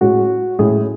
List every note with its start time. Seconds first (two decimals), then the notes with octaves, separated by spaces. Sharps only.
0.01 A2 G#3 C#4 F#4
0.59 A2 G#3 C#4 G#4